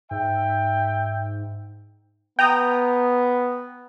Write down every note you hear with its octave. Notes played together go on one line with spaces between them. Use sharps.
G#2 E5 G5
B3 G5 A#5 D#6